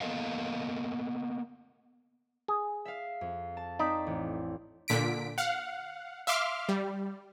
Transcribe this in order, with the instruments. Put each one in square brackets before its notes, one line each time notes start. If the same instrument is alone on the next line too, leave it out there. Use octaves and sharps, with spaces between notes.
[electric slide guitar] A#3 B3 A4 A#4 D#5 F5
[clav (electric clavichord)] G#4
[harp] E5 F5
F2
A5
[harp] C4 D5 B6 [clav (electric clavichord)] D#4
[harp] A1
[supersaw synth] A#2 D3 B6 D7
F5 F#5
E5 F5 C6 D6 F6
G3